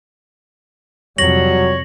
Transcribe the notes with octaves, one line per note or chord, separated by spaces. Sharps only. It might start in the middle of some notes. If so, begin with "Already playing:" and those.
F2 C3 F#3 G3 C#5 A#6 F#7